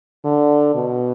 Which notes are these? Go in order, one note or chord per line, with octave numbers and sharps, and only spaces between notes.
D3
B2